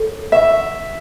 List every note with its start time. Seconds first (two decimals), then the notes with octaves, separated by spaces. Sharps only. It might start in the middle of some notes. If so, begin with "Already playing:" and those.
Already playing: A4 C#5
0.32 B4 E5 F#5 C#6